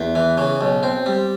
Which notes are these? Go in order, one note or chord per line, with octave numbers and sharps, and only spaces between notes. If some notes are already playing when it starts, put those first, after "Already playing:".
Already playing: E2
E3
C#3
B1
C4
G3